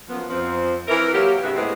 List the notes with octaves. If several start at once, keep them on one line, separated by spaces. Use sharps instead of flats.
F#2 F3 B3
F2 F3 C4
E3 A#4
F#3 A#3 F#4 G4
G2 C3 B3 F#4 G#4 E5
A2 G#3 B3 C4 E4